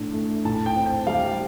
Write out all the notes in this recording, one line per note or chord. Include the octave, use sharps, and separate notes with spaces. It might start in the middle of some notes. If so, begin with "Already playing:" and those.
Already playing: A2 A3 D4
A3
A2 A5
G5
C4
G5
G3 F5